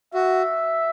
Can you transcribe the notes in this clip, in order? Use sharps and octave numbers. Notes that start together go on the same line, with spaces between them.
F#4 E5